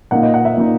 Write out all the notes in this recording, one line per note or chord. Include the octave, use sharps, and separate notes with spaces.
A#2 A#3 D#4 F#5
D#5
F#5
E5
A#2 A#3 D#4